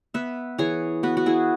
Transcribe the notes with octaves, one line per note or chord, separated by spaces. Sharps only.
B3 B4 E5
E3 G#4 C#5
B3 F#4 B4
F#4
E4 G#4